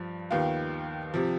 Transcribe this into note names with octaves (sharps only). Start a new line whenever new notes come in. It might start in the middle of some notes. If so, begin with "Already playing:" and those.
Already playing: G2 F3
D#2 D#3 B3 F4
C3 F3